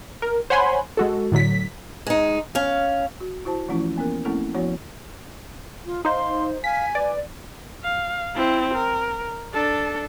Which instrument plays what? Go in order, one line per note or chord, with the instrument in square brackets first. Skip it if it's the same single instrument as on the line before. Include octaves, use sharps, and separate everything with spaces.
[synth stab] A#4
C5 C#5 F#5 G#5 B5 C6
G#3 F#4 A4
A2 D3 F#3 B6
[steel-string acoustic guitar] G#3 D#4
C#4 F5
[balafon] F#4
E4 F#4 C5 A5
E3 F3 A3 C#4 E4 F4
A#3 B3 C#4 A#4
A3 A#3 C4 C#4 E4 A4
F3 B3 E4 F#4 C#5 F#5
[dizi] F4
[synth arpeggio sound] D#4 C5 [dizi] F5 [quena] C6
[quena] F5 [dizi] G#5 [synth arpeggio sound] B6
[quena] B4 [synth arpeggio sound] D5
[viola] F5
C4 E4
A#4
D4 A4